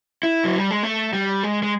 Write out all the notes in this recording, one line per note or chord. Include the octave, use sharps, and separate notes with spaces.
E4
F#3
G3
G#3
A3
G3
G#3
G#3